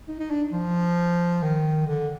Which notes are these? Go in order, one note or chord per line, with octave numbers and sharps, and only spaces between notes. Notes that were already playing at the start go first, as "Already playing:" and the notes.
D#4
D#4
D4
F3
D#3
D3